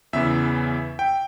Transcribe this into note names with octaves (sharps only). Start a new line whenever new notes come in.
E2 C#3 E3 E5
G5